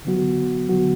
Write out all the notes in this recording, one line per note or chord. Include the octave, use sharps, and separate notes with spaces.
D3 F#3 B3 F#4
D3 F#3 B3 F#4